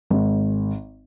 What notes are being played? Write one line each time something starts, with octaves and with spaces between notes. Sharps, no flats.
G#1